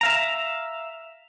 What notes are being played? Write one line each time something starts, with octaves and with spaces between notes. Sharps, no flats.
E5 F5 A#5